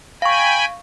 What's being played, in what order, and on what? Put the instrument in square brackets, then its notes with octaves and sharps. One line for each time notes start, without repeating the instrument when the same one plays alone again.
[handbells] F5 C#6 [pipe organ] G5 G#5 B5